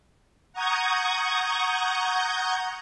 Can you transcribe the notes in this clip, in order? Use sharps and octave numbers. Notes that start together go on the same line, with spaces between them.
F#5 A#5 C#6 D#6 G6 G#6